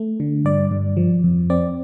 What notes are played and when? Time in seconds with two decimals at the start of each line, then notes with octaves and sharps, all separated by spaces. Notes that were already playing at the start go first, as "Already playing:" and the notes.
Already playing: A3
0.20 D3
0.45 G2 D5
0.71 G2
0.97 F3
1.24 F2
1.50 C4 D5